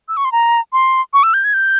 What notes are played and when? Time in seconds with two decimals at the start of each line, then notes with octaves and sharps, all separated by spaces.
0.08 E6
0.17 C#6
0.25 C6
0.32 A#5
0.73 C6
1.14 C#6
1.23 E6
1.34 G6
1.44 G#6
1.54 G6